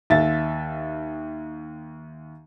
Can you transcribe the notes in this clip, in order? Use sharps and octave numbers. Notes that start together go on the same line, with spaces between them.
D#2 E5 A6